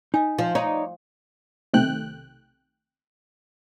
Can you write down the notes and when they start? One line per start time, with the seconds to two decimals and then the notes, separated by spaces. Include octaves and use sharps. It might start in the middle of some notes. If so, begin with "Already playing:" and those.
0.14 D#4 D#5 F5 G#5
0.39 F3
0.55 D#4 C#5 D5
1.73 B1 C3 D#3 A3 G5 F#6